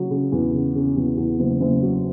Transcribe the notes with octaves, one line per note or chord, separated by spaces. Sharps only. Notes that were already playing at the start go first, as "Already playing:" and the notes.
Already playing: C#3 F#3
C#3
E2
C#3
C#3
E2
E2
F#1
F#1
F#3